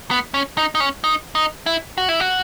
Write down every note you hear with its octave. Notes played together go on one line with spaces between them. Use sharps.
B3
C#4
D#4
D#4
C#4
D#4
D#4
E4
F#4
E4
F#4